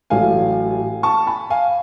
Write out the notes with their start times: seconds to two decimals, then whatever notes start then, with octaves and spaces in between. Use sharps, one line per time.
0.10 A1 A2 F#3 A3 F5 G#5
1.03 A5 C#6
1.27 G#5 B5
1.50 F5 G#5